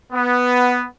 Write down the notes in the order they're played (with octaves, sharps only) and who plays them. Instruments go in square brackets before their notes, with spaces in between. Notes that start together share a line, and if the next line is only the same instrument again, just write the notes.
[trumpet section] B3